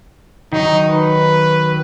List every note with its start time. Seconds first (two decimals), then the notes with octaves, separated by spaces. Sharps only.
0.53 D#3 F#3 D#4
0.89 B4